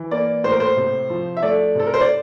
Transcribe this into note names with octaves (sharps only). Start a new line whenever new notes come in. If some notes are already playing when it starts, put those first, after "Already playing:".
Already playing: E3
A#3 D5
A2 C5
A#4
C5
C3
F3
E5
A3 D5
C3 A4
A#4
C5
D5